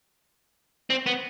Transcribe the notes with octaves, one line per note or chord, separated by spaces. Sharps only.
C4
B3